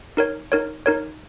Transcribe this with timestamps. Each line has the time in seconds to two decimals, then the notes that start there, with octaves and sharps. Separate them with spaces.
0.17 D#4 A#4 C#5
0.52 D#4 A#4 C#5
0.86 D#4 A#4 C#5